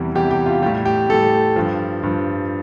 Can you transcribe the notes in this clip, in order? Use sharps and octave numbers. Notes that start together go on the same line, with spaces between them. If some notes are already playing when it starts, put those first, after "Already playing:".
Already playing: E2 C3 E3 G3
E2 C3 E3 G3 G4
G4
F4
A2 G3 G4
G4
A2 G3 A4
G2 F3
G2 F3